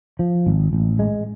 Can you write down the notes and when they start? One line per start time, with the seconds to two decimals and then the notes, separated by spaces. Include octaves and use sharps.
0.19 F3
0.47 G#1
0.73 A1
0.99 G#3